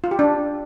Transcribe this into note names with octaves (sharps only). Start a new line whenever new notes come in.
F4
G4
D4